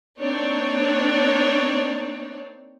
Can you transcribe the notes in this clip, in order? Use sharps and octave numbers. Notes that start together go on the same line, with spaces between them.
A#3 C4 D4 D#4 C#5 D5